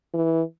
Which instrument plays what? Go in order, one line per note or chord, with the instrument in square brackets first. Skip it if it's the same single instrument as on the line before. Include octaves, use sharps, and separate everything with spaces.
[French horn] E3